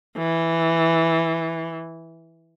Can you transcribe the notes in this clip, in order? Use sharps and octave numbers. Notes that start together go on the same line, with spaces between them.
E3